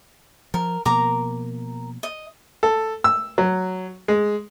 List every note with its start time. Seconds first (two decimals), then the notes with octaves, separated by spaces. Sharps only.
0.54 F3 A#4
0.85 B2 F3 A#3 A#4 A#5 D6
2.03 D#5
2.63 A4
3.04 E6
3.38 F#3
4.08 G#3